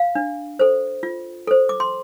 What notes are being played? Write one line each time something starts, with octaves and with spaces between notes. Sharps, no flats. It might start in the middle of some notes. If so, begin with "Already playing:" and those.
Already playing: F5
D4
A4 C5
F4
A4 C5
D6
C6